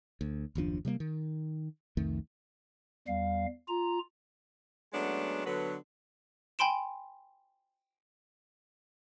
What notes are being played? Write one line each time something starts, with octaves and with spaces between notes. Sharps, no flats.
D2
F#1 D#2 F3 D4
C3 G3 G#3 A#3
D#3
C2 F2 D#3 A3
E2 G3 F5
F4 A#5
F#3 G#3 A3 B3 C#4 D4
D3 F#3 B3
G5 G#5 B5 C6 D7 E7